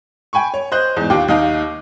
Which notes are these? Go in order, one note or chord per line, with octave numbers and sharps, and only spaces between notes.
G5 G#5 B5 C#6
C#5
C5 D#5 F#6 G6
E2 G#2
D#2 F4 G4 G5 D6
D#2 D#4 D#5 F5